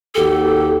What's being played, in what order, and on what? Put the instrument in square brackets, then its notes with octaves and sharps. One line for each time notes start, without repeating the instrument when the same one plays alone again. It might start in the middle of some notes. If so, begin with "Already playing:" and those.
[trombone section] D#2 F#4 G4 [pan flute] A4